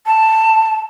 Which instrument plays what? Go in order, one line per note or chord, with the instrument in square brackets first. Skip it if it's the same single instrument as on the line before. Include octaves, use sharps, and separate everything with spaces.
[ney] A5